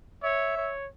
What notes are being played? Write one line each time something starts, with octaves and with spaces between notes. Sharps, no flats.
C#5 E5
C#5